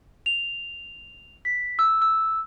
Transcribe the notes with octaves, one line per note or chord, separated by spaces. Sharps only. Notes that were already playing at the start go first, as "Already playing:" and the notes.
F7
B6
E6
E6